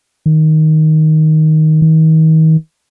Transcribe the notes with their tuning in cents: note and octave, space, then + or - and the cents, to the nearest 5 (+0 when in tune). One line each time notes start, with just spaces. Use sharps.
D#3 +5
D#3 +35